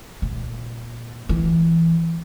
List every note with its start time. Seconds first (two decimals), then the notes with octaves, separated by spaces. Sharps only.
0.22 A#2
1.29 E3